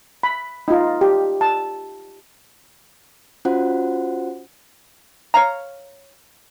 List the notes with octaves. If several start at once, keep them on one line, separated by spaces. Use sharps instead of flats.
B5
D#4 F4
G4
A5
C#4 F4 F#4 C5 F#5
C#5 F5 A#5